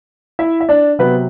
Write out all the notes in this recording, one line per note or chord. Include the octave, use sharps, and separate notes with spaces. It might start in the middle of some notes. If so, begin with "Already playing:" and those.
E4 E5
E5
D4 D5
C3 F#3 B3 B4